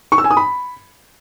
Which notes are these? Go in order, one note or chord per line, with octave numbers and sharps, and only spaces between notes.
C#6
E6
G#5
D#6
B5